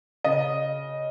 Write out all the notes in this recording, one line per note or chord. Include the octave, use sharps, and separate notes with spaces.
C#3 D#5